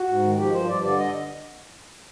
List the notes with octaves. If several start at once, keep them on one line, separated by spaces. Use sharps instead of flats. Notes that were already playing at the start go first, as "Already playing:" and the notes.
Already playing: F#4
G#2
D#3
F3 G4
G2 C5
G2 D5
D3 D5
D#5